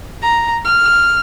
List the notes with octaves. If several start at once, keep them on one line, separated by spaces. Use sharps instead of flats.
A#5
F6